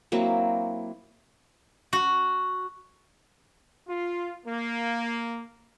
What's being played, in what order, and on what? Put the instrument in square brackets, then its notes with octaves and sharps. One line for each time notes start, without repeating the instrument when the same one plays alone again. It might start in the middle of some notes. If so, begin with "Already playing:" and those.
[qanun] F#3 A#3 C4 E4
[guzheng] F#4
[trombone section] F4
A#3